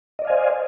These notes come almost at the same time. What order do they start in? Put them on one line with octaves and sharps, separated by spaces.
D#5 D5 F5 G#5 C5